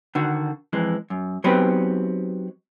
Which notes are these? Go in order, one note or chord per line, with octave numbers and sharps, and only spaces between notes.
D3 D#3 F#4
F2 E3 G#3
F#2
F#3 B3 C4 D#4 G4 B4